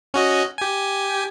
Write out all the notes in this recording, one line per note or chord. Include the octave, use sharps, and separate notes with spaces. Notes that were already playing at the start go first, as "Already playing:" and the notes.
C#4 F#4 D#5
G4 G#5